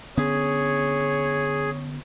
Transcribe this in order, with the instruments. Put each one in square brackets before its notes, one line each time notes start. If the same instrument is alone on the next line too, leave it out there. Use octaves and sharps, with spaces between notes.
[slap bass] D3 B3 C#4 [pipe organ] G#4 [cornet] C#5